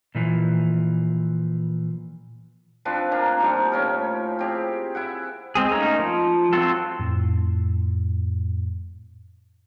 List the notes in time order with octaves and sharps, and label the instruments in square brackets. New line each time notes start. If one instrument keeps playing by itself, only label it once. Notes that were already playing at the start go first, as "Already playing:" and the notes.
[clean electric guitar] A#2 E3 F3
[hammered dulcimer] F3 C4 D4 B4
A#3 D4 A#5
F3 G3 D#4
A2 C#4 A#4
C4 G4 G#4
E4 E5 F#5
[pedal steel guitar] G#3 C4 G#4
A3 A#3 C#4 D#4
F3
F#3 C4 F4 A4
[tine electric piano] F2 A2